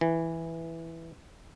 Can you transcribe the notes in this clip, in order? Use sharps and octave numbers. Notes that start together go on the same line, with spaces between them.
E3